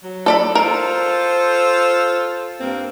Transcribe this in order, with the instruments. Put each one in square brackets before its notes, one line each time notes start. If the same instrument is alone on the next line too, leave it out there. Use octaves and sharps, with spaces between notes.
[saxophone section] F#3
[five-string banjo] A4 D5 B5
[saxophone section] F4 A4 C5 [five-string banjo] A#4
[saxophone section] G2 A#3 C4